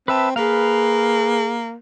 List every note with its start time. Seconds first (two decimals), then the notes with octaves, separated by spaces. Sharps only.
0.08 C4 B4 E5 A5
0.36 A#3 G#4 B4 F5